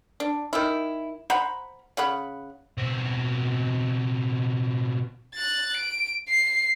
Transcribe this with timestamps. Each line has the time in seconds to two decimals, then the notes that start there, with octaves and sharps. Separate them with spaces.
0.20 D4
0.53 D#3 E4
1.30 C5 F#5 A#5 B5
1.97 C#3 F#5 B5
2.78 B2 C4
5.35 F#6 A6
5.76 D7
6.29 C7